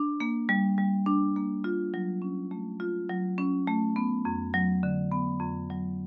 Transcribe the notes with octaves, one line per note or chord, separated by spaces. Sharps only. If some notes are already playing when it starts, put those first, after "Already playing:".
Already playing: D4
A#3
G3
G3
D4
A#3
F4
F#3
C#4
A3
F4
F#3
C#4
A3
B3
F2
F#3
D3
B3
F2
F#3